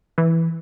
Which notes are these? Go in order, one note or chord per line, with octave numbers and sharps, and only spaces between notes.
E3